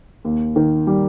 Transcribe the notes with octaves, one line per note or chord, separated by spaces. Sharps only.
D#2
D#3
G3